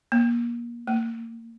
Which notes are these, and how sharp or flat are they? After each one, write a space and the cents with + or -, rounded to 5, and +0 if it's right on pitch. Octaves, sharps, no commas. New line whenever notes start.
A#3 +30
A#3 -30